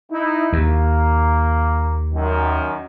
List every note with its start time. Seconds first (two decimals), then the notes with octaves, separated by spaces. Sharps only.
0.11 D#4 E4
0.53 D#2 A#3
2.13 F#2 D#3